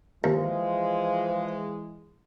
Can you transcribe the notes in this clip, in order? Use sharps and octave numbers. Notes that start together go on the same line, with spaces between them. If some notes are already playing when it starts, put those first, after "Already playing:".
D#2 E3 F3 G#3